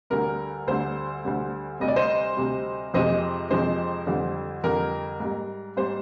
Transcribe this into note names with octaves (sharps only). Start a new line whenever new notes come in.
D2 D3 G3 A#4
D2 D3 G3 C5
D2 D3 G3
D2 C3 G3 D#5
D5
C5 D#5
D2 C3 G3
F2 C3 F3 G#3 C5 D#5
F2 C3 F3 G#3 C5
F2 D3 G3
F2 D3 G3 A#4
G#2 G3
G#2 G3 C5